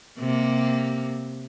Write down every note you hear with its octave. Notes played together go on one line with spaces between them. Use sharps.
C3 A#3